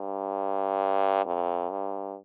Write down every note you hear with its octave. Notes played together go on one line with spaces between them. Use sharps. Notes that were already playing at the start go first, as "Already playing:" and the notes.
Already playing: G2
F2
G2